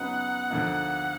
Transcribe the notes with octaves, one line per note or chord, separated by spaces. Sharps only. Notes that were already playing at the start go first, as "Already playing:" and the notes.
Already playing: F#2 C#3 F#3 B3 D#4 F#5
D2 D3 F3 A#3 D#4